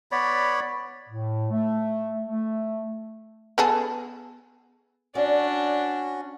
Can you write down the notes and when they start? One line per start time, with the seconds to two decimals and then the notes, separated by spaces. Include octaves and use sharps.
0.12 B3 C#5 D5 B5
1.09 A2
1.50 A3
2.28 A3
3.58 B3 G#4 A4
5.15 C#4 D4 F#4 D5